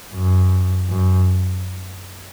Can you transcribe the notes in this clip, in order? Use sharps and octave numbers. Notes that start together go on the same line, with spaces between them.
F#2
F#2